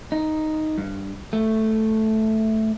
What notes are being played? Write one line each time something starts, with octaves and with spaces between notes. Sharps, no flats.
D#4
G2
A3